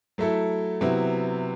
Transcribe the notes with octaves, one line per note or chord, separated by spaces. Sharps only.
F#3 A3 E4 A4
C3 F#3 B3 E4